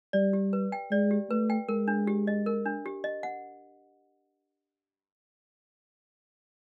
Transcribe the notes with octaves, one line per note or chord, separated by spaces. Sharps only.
G3 D5
G4
B4
G5
G#3 D5
G4
A3 B4
G5
G#3 A#4
D4
G4
D#5
A#4
D4
G4
D#5
F#5